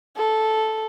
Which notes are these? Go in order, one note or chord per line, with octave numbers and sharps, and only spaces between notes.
A4